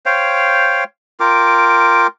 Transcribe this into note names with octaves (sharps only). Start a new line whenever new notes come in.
C5 C#5 F5 G5
F4 A#4 G5 D6